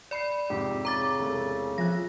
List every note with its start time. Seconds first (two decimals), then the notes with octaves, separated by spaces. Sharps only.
0.11 D5 B5 C7 C#7
0.50 F2 G#2 C3 G4
0.85 C#3 A#5 D6 A6
1.19 E1 C3 A3
1.78 F3 E5 G#5 F#6 A#6